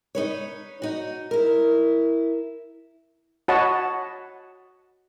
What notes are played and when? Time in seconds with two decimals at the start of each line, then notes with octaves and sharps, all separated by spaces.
0.15 D#4 B4 C#5
0.82 D#4 F#4
1.31 E4 A#4
3.48 F#4 C#5 D#5 F#5 A5 B5